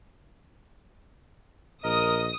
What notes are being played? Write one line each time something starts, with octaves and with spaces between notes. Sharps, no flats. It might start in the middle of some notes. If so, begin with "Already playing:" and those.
A#1 A#4 D#5 D#6